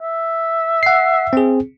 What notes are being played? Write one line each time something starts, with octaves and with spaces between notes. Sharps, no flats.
E5
F#5 C7
C4 G#4